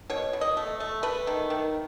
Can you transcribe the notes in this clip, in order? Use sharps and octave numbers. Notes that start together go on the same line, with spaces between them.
B2 C#5
B2
D#5
A3
A3
A3 B4
D#3
D#3